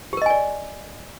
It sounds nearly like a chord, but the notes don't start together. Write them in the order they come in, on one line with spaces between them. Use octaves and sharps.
G4 A#4 D#5 G#5 D5